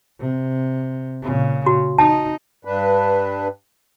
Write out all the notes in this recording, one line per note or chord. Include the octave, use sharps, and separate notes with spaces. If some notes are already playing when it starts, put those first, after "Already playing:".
C3
A#2 C#3
F#4
D#4 A5
G2 D4 B4